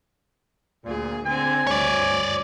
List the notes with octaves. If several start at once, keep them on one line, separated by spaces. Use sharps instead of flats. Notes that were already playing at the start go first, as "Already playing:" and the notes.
D2 A#2 G#4
D3 C4 C5 G#5
D2 G2 C#5 D5